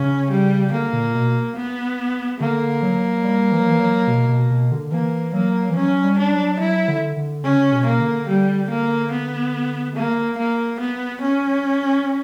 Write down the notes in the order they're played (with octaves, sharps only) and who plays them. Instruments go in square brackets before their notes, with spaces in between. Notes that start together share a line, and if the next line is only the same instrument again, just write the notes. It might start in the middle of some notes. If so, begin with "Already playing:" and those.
Already playing: [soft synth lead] C#3 [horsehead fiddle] C#4
[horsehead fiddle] G3
[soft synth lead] D3 [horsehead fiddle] A#3
[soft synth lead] A#2
B2
[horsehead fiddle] B3
[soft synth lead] D3 [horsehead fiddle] A#3
[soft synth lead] F#3
G3
E3
F#3
E3
F#3
B2
B2
B2
D3
[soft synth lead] E3 [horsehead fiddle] A#3
[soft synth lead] F#3 [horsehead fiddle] A#3
[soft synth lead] E3
[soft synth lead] F#3 [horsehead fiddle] C#4
[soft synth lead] G3
[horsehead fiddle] D4
[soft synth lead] F#3
[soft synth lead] F#3 [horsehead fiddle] E4
[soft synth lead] D3
D3
[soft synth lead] C#3 [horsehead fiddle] C#4
[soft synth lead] B2
[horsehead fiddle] A#3
[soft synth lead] D3
[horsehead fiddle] G3
A#3
B3
A#3
A#3
B3
C#4